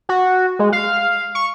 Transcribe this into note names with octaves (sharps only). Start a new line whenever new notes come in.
F#4
G#3
F5
C#6